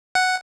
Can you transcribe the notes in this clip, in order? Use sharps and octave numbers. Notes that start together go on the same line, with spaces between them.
F#5